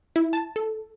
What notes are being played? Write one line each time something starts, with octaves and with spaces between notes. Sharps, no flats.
E4
A5
A4